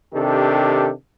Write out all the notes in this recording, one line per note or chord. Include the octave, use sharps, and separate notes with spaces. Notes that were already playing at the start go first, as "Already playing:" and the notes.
C3 D#3 D4 G4 A4